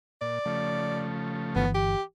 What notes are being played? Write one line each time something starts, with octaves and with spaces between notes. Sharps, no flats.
A#2 D5
C#3 F3 A3
G1 E3 B3
G4